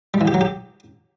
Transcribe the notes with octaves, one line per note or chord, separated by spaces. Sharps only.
G3
E3
G4
F#3
G4